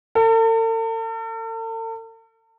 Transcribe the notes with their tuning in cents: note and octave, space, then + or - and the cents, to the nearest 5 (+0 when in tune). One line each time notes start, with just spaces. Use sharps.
A4 +45